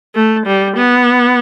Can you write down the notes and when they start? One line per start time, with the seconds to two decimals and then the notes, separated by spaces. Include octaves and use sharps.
0.15 A3
0.46 G3
0.76 B3